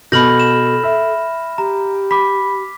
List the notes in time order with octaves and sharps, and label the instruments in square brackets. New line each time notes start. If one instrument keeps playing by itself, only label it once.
[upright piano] B2 [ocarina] A4 [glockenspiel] B5 F6 A#6 [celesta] G6 F#7
[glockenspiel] E7
[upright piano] E5
[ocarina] G4 [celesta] A#5
[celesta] B5 [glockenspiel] D6 B6